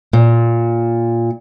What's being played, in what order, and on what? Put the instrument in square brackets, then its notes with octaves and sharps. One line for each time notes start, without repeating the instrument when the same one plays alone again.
[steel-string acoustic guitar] A#2